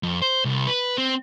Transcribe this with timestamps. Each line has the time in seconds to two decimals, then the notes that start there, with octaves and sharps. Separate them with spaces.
0.03 F2
0.22 C5
0.45 C2
0.67 B4
0.98 C4